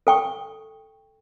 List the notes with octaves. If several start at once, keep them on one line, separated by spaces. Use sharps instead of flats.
A4 G5 C#6